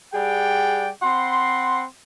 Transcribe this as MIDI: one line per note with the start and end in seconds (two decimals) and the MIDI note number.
0.13 0.88 55
0.13 0.88 68
0.13 0.88 74
0.13 0.88 78
0.13 0.88 79
1.03 1.83 60
1.03 1.83 78
1.03 1.83 83
1.03 1.83 84